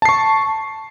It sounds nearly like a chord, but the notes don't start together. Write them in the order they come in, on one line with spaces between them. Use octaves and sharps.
A5 C7 C#6